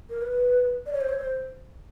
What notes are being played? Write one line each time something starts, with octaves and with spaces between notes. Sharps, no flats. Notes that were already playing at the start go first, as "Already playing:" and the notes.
A#4
B4
D5
C#5
C5
C#5
C5